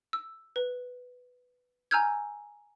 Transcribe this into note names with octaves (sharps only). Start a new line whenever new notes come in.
E6
B4
G#5 A#5 E6 F6 G6 G#6